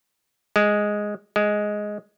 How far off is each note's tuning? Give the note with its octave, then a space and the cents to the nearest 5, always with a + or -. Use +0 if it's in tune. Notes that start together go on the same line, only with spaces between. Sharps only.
G#3 +0
G#3 +5